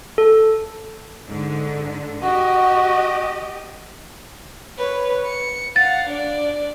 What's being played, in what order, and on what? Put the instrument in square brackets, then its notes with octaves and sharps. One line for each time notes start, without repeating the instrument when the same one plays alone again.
[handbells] A4
[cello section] G#2 D3
[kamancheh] F#4 [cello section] G4 D#5
[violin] B4 C#5
C#7
[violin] F5 F#5 [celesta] A6
[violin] D4 D5